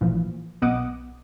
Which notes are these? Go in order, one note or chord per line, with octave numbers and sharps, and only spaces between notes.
A1 A#2 E3 F3
B1 B3 D#5 F#5 D6 D#6